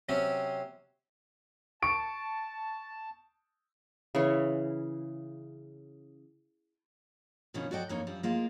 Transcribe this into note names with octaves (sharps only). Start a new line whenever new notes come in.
C3 F#3 C4 C#4
A5 C#6 D7
C#3 E3 C#5
B2 D#3 F3 B3 C#4
F#4 A4 D5 D#5 F#5 G5
F2 A#3 D#4 C#5
F#2 F3 G3
G#3 A#3 F4